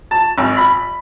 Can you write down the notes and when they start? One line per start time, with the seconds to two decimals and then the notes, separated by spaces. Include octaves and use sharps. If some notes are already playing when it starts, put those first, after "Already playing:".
0.11 A5
0.38 G#1
0.57 B5